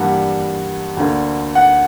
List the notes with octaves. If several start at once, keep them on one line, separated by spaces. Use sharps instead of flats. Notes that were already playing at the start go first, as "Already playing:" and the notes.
Already playing: G2 E3 G3 A#3 F#5
D2 D3 A#3
F#5